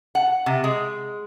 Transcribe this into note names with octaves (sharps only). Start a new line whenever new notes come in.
F#5
C3
G#3